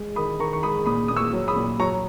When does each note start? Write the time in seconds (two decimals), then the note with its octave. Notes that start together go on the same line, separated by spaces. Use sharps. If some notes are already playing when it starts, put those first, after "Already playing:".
Already playing: G#3
0.16 D#3 B5 D#6
0.40 D#3 A#5 C#6
0.53 C#6
0.63 G#3 B5 D#6
0.86 A#2 B5 D#6
1.08 A#2 D#6
1.17 C#6 E6
1.33 F#3
1.48 B5 D#6
1.56 A#2
1.79 F#3 A#5 C#6